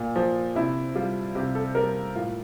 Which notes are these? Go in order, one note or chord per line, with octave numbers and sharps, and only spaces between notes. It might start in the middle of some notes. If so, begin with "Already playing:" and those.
Already playing: A#2
F3
C3 E4
G3 F4
C3 G4
A4
G3 A#4
A2 F4